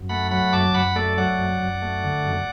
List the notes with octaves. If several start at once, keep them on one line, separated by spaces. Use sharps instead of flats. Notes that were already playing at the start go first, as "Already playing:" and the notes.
Already playing: F#2
A3 F#5 B5
F#3 F#5 B5
F#2 A5 D6
F#2 F#5 B5
A3 A4 D5
F#3 D5 F#5
F#2
F#2
A3
D3
F#2